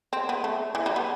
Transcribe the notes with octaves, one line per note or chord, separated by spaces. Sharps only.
C4
B3
A3
E3
G3
B3